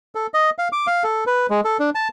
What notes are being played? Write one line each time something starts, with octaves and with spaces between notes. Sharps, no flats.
A4
D#5
F5
D6
F5
A4
B4
G#3
A4
D4
A5